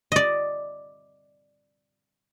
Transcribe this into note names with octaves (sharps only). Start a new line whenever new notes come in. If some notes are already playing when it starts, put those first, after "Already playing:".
D5 D#5